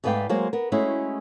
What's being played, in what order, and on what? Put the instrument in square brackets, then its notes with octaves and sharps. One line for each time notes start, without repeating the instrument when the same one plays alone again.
[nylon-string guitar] G#2 A3 B4 D5 F5 G5
F#3 G#3 A#3 C5
B3 A#4
G#3 A3 C#4 E4 F#4